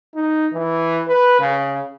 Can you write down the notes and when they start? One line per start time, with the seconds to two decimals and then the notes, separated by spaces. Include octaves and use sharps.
0.15 D#4
0.53 E3
1.08 B4
1.40 C#3